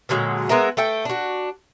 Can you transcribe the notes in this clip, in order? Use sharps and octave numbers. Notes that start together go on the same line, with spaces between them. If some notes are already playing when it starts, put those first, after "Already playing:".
A#2 D3 F#3 G#3
G#3 B3 A#4 E5
A3 A4 G5
D4 F#4